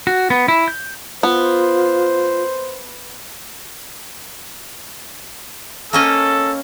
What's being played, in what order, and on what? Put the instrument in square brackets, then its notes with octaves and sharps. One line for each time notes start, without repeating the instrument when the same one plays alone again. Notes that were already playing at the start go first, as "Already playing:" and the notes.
[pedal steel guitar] F#4
B3
E4
G6
[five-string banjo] B3 [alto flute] F4 [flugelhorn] C5
[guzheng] A#3 C#4 D#5 [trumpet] A4